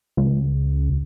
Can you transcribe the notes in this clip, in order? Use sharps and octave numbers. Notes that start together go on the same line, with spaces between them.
C#2